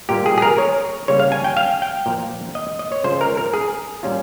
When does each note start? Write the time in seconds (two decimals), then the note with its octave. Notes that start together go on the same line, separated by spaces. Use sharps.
0.09 A#2 G3 A#3 G4
0.26 G#4
0.38 G#4
0.42 A#4
0.58 C#5
1.08 C#3 G3 A#3 C#5
1.20 F5
1.32 G#5
1.44 G5
1.57 F5
1.82 G5
2.06 A#2 F3 A#3
2.55 D#5
2.79 D#5
2.92 C#5
3.04 C#3 G#3 C#4 F4 C5
3.21 A#4
3.37 A#4
3.53 G#4
4.03 A#2 G3 C#4 F4